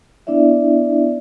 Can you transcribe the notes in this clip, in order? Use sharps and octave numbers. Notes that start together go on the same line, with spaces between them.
B3 D4 E4 D5 E5